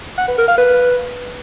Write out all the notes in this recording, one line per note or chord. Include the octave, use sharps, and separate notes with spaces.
F#5
B4
A#4
F5
B4